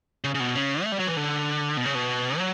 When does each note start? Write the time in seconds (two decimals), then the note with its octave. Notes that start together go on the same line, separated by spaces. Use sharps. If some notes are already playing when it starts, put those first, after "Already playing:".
0.24 C#3
0.35 C#3
0.40 B2
0.55 C#3
0.84 A3
0.92 G3
1.00 F#3
1.07 E3
1.17 D3
1.77 B2
1.86 C#3
1.95 B2
2.38 F#3